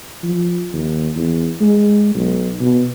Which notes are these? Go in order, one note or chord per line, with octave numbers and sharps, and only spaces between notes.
F3
D#2
E2
G#3
B1
B2